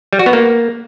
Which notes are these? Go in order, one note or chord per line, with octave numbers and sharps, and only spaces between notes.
G3
F#4
B3
A#3